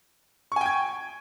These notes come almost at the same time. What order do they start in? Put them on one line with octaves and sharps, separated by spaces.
C#6 G#5 G5 G#6